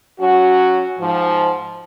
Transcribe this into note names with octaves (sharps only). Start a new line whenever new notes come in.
F#3 C#4 F#4
G#2 F3